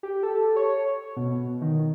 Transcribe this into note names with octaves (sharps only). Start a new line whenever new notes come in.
G4
A4
C#5
B2
D#3